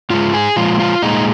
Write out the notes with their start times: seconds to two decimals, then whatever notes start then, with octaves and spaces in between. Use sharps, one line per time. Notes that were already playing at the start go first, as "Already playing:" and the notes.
0.10 G#2 G#3 F4
0.34 G#4
0.56 A#2 F3 G#3 F4
0.79 F4
1.02 A#2 G#3 D#4